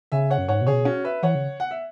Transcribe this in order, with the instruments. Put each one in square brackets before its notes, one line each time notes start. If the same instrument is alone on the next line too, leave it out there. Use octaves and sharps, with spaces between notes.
[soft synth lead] C#3 [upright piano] E5 G#5
[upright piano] C#5 F#5
[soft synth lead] F#2
[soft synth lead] G#2 [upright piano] C#5 F#5
[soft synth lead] B2
[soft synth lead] C#3 [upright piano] G#4 C#5
[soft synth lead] B2
[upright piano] C#4 F#4
B4 E5
[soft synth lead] E3 [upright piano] C#5 F#5
[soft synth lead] C#3
[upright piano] F#5
E5